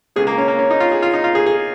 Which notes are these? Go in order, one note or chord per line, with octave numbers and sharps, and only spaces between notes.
C#2 C#3 G#3 G#4
A#3
C#4
A#3
C#4
D#4
F4
G#4
F4
D#4
F4
G#4
G#4